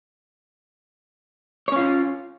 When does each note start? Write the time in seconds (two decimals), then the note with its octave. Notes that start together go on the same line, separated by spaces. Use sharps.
1.68 C#5
1.72 C#4
1.76 F4